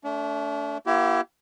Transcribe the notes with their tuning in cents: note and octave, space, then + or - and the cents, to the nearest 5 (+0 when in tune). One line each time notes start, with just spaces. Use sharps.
A3 +0 D4 -35
A#3 +45 E4 +25 G4 -25